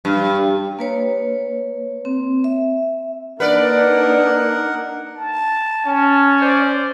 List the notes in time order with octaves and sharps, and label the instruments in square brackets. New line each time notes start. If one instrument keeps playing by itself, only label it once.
[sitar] G2
[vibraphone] A#3 B4 C#5
C4
E5
[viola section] A#3 D4 D#4 [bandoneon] A#4 F#5 [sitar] B4 D5
[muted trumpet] A5
[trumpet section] C#4
[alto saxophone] C5 [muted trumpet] D5